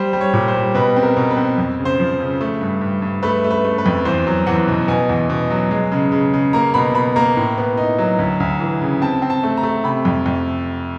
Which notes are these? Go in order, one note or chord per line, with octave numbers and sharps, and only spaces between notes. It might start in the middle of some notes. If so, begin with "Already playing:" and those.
Already playing: G3 C5
G3
C#5
A#2
C5
G3
B2 B4
C4
A#4
B2
B4
C4
F2
C#3
C5
F3
C#3
A3
G2
G2
G2
A3 B4
A3
B4
A3
B4
F2
E2 C5
F#3
E2 F#5
B2
B2 G#5
E2
B2
F#3
G#3
C#3
C#3
C#3
A#3 A#5
B2 B5
B2 B5
A#3 A#5
A2
B3
D#4
F#3
D2
D2
E3
C#3
C4 A5
C4
A5
A3
A#5
A3
C3 B5
F2
F2